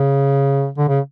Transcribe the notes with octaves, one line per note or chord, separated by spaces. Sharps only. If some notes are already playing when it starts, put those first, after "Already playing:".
Already playing: C#3
D3
C#3